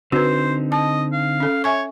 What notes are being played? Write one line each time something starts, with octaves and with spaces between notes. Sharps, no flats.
D3 C4 D#4 F#4 B4 C5
D#5 A5
F5
C#4 A4
C#5 E5 G#5 C#6